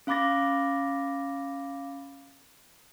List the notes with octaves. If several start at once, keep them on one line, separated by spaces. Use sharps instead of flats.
C#4 F5 B5 D6 A6 A#6